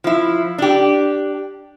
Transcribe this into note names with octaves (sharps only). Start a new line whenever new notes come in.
F3 E4
D4 G4